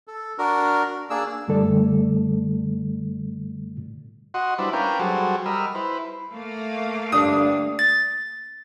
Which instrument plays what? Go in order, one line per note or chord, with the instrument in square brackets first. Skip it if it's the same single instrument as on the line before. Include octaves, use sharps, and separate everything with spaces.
[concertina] A4
D4 F#4 A#4
A#3 D4 G#4 E6
[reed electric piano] F#2 D3 G3 A3 A4 D5
[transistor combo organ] F#4 D#5 F#5 C6
G3 D4 E4 B4 C5
C#4 D4 A#4 B4 F5 G5
F#3 G3 F#4 G#4 A4 C5
G3 A#4 D#5 B5 E6 F6
E4 B4 C5
[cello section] A3 A#3 F5
[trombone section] G2 D3 D4 [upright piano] D#6
[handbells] A6